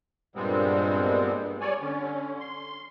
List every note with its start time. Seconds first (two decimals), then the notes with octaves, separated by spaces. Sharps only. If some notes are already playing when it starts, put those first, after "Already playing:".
0.36 G2 A#2 G3 G#3 B3 C4
1.61 G3 C#5 D5 G#5
1.82 D3 C#4
2.40 C6